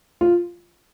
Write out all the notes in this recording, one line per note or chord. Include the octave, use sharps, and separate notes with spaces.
F4